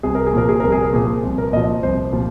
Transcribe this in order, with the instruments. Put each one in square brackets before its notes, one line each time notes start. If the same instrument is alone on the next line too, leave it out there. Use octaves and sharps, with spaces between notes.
[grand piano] C2 G#4
A#4
G#4
A#2 F3 A#4
G#4
C2 A#4
G#4
A#4
A#2 F3 G#4
C2
A#4
A#2 D#5
F3
C2 C5
A#2 F3 F4